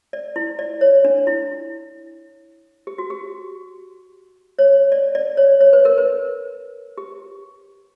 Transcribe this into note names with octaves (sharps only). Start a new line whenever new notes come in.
D5
E4
D5
C#5
D4
E4
G4
F#4
G4
C#5
D5
D5
C#5
C#5
B4
A#4
B4
G4